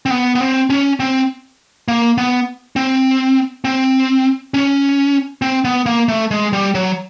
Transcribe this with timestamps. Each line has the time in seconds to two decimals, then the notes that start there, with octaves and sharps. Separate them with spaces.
0.06 C4
0.10 B3
0.35 B3
0.41 C4
0.70 C#4
1.00 C4
1.88 A#3
2.18 B3
2.76 C4
3.65 C4
4.54 C#4
5.42 C4
5.65 B3
5.86 A#3
6.08 A3
6.31 G#3
6.53 G3
6.75 F#3